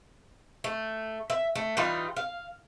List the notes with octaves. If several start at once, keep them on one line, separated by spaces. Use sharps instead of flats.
A3
E5
A3
E3 G3 D#4 F4
F5